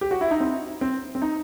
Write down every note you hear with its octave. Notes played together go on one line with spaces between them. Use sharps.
G4
F#4
E4
D#4
C4
C4
C4
D#4